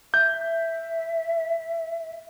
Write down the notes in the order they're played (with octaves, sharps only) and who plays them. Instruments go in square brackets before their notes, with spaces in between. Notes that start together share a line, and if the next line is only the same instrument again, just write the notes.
[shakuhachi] E5 [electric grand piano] G6